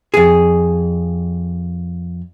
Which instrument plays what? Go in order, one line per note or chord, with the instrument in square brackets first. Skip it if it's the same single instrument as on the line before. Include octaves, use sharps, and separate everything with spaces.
[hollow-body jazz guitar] F2 G#4